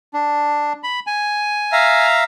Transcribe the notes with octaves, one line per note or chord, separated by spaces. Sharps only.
D4
B5
G#5
E5 F5 A#5